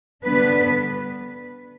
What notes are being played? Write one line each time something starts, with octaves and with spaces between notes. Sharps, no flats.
D3 G3 B3 D4 B4